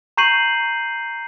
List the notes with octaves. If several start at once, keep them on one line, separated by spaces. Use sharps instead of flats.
A#5 C#6 G6 C7 D#7 F#7